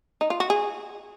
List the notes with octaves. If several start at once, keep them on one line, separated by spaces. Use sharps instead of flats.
D#4
F4
F#4
G#4